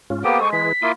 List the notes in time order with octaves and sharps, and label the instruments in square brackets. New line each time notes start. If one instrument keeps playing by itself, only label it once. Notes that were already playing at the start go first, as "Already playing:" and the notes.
[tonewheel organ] G#2 C#4 F4
[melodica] A#3 B3 G4 [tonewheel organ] A4 C5 D#6 [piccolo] D7
[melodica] G#3 [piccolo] C#6
[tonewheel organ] E3 G#4 B4 [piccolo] B6
[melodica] A#3 E4 F4 [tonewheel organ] C6 D6 D#6